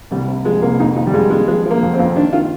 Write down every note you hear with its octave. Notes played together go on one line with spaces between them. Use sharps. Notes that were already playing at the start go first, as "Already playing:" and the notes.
C2 G3
C3
F3 G#3
C2 A#3
F2 D#4
F2 D#4
G3
F2 G#3
D#3 G#3
F3 G#3
F3
A#3
F2
C4
F2
D#3 D4
D#3 F4